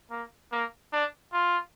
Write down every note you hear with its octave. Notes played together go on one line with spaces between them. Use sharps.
A#3
A#3
D4
F4